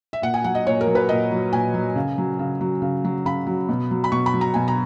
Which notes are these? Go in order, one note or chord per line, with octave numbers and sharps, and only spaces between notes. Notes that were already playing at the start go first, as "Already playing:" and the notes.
E5
A#2 F#5
G#5
F#3 F#5
D#5
A#2 C#5
A#4
F#3
B4
A#2 D#5
F#3
A#2 G#5
F#3
C#3
F#3
C#3
F#3
C#3
F#3
C#3 B5
F#3
B2
F#3
B5
B2 C#6
B5
F#3
A#5
B2 G#5
A#5